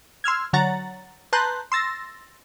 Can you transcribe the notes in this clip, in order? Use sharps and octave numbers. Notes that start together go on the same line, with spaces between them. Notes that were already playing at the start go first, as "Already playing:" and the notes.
C6 E6 F6 G#6
D3 F#3 C#5 F#5 A#5 A6
B4 A5 A#5 C6 F#6 G6
C6 E6 A6 A#6